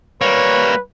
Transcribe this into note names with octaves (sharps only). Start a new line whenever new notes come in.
G3 A#3 B4 C#5